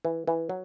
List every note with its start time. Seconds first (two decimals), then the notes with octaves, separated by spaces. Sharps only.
0.05 E3
0.27 E3
0.49 F#3